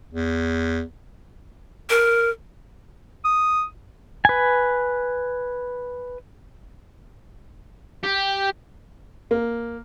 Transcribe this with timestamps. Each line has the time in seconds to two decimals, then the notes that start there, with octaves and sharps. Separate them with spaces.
0.13 E2
1.90 A#4
3.25 D#6
4.25 B4 G#5
8.04 G4
9.31 A#3